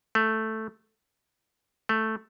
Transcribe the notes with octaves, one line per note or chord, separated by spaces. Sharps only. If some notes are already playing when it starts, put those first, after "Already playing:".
A3
A3